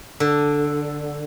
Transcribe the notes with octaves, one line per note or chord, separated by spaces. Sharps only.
D3